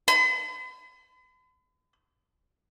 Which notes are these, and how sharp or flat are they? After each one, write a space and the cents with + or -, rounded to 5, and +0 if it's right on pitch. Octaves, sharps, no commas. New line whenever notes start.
B5 +45